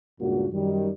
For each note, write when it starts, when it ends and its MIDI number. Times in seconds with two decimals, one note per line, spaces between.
0.20 0.47 37
0.20 0.47 43
0.20 0.47 46
0.20 0.47 58
0.20 0.47 66
0.53 0.90 42
0.53 0.90 51
0.53 0.90 55